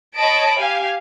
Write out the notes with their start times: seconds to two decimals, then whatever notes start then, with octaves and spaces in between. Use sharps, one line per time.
0.17 C#5 D#5 A5 B5 D7
0.59 G4 F5 G#5